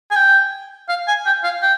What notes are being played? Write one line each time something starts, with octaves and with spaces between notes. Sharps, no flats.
G#5
G5
F5
G#5
G5
F5
G5